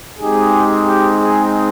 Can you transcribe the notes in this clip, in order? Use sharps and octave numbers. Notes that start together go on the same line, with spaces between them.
G#3 C4 D#4 G4 G#4
G4
G#4